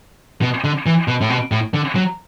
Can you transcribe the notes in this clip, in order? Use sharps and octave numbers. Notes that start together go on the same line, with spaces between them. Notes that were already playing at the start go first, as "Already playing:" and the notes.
B2
D3
E3
B2
A2
B2
A2
D3
F#3